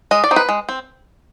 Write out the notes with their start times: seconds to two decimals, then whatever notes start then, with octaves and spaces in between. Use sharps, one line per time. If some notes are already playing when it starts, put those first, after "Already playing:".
0.11 G#3 D#5
0.24 D5
0.31 C4 D#4
0.36 B4
0.49 G#3
0.69 C4